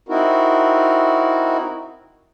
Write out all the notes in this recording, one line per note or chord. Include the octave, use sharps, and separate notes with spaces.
C4 D#4 E4 F#4 A#4